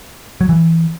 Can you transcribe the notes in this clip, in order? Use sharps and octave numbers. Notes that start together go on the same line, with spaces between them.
F#3
E3